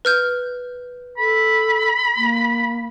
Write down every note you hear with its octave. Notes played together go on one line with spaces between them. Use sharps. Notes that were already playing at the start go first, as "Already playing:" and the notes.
B4 F6 G6
A4 B5
A#3